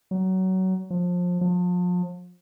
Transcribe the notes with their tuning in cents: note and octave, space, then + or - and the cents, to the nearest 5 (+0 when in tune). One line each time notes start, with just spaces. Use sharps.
F#3 +20
F3 +25
F3 +35